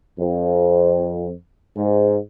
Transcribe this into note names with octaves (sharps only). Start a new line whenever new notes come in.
F2
G#2